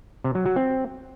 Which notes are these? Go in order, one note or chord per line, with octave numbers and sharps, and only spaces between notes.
C3
F#3
F#3
C4